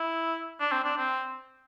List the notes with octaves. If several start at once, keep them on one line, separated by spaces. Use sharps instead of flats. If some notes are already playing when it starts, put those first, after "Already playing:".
Already playing: E4
D4
C4
D4
C4